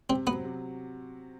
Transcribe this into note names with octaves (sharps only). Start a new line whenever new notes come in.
C3 C4
F#3 B3 C4
C3